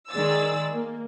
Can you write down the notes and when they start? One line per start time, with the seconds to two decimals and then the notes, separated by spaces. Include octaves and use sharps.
0.12 D#3 G#3 G#4 D5 E6 A6
0.73 A#3